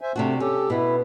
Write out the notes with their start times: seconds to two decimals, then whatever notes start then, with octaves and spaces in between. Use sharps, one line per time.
0.01 C5 E5 G#5
0.16 C3 A3 D4 F#4
0.40 C#4 G4 A4
0.70 B2 B3 E4